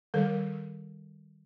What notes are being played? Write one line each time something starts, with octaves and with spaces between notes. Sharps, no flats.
D#3 G3 A4 A#4